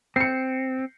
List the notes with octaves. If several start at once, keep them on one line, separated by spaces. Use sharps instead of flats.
C4 C7 C#7